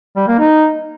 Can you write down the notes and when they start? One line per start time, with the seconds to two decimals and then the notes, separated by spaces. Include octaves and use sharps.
0.17 G3
0.28 A#3
0.39 D#4